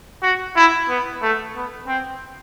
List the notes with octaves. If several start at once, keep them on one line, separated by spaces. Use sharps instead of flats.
F#4
E4
B3
A3
B3
C4